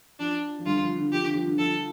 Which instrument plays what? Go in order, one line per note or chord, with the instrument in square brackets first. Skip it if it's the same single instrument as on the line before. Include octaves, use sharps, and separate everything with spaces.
[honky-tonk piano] F3 [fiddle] D4
[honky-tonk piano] F3
[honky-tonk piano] D3 G3 [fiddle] F4
[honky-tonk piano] F3
D3
[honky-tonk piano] F3 [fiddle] G4
[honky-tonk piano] D3
F3
D3
[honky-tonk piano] F3 [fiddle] A4